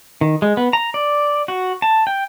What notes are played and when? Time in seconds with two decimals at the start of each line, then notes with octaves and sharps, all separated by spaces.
0.21 D#3
0.42 G#3
0.57 B3
0.73 A#5
0.94 D5
1.48 F#4
1.82 A5
2.07 G5